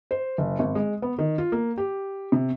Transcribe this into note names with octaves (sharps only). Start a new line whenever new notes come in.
C5
F#1
G#1
G#3
B3
D#3
F4
A#3
G4
C3